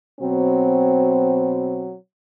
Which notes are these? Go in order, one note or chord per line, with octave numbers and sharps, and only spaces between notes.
B2 F#3 C4